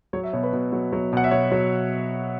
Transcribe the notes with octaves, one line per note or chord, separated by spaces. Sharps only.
F#3 C#5
E5
B2 C#5
B4
B2
F#3
F#3
B2 F#5
E5
B2 C#5
F#3